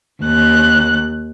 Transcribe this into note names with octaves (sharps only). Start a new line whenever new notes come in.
D#2 F#6